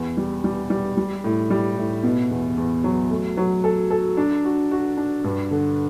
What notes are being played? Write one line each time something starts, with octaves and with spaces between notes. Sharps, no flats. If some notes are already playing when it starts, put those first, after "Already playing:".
Already playing: E2
G3
G3
G3
G3
A2
G3
A2
B2
E2
E2
F#3
A3
F#3
A4
A4
D4
F#4
F#4
D4
G2
D3